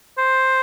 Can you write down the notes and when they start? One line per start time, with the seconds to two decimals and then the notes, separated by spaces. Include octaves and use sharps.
0.18 C5